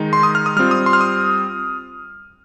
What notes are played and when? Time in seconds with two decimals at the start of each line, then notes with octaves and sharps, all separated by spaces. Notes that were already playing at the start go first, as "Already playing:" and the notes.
Already playing: D#3 G#3 D#4
0.13 C6
0.23 D#6
0.35 F6
0.46 D#6
0.56 G3 C4 F4 F6
0.71 D#6
0.86 C6
0.93 F6
1.01 D#6